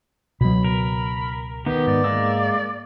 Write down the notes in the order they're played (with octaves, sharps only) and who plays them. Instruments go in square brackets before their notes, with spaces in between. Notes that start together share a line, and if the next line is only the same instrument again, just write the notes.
[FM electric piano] C#2 [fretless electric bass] B2 F#3 [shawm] B5
[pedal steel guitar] A#4 [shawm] B5
[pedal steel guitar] D#3 B3 [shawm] G4
[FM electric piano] G#2 [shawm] D5
[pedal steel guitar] G#3 A#3 E6